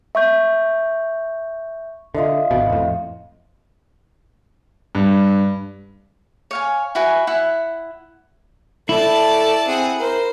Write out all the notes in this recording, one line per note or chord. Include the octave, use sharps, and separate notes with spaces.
E5 C#6 G6
D3 F4 D#5 E5
G#1 B2
F2 A2
G2
C#5 F5 G#5
E4 F#4 B4 G#5
E4 F#5
E4 A4 D5 A5
C4 G#4 F#5
A#4 C5